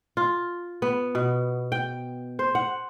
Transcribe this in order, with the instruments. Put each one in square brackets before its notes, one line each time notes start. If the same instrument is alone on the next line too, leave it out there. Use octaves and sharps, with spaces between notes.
[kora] F4
B3
B2
G5
C5
F#5